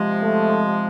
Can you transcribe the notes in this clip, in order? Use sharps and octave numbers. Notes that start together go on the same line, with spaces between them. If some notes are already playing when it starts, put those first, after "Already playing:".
Already playing: C3 F3 G#3
A3